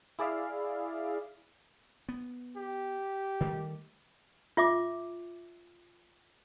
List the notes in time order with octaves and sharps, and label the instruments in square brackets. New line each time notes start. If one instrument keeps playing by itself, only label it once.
[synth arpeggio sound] E4 G#4 D5 E5 F5
[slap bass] B3
[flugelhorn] G4
[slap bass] D#3 G3 A3
[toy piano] F4 E5 D6